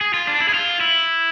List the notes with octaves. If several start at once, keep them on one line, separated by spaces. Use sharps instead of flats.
G#4
F4
D4
E4
G#4
F4
E4